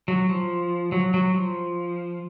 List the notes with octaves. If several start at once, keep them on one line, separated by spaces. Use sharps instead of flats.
F#3
F3
F#3
F#3
F3